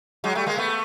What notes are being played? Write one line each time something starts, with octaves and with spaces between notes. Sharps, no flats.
F#3 G#3
G3 A3
G#3 A#3
A3 B3